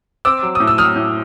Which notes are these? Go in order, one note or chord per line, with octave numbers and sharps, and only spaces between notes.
C4 D6 E6
F#3
A2 D#6
E6
F#3 D#6 F6
A2